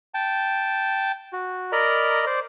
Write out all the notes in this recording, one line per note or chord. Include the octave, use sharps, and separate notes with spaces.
G5 A5
F#4
A#4 D5 D#5 A#5 B5
C5 D5